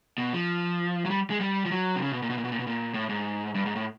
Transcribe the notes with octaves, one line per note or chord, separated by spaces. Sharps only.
B2
F3
F#3
G3
G#3
G3
F3
F#3
C3
C#3
B2
A#2
B2
A#2
B2
A#2
B2
A#2
A2
G#2
G2
G#2
A2